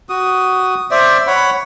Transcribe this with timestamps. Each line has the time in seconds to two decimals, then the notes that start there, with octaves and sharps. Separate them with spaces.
0.09 F#4 D#6
0.91 C5 D5 E5
1.27 C#5 F#5 B5